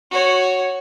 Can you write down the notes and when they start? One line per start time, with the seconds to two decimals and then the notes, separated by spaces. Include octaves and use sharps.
0.11 F#4 C#5